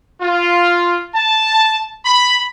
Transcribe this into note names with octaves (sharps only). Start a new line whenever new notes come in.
F4
A5
B5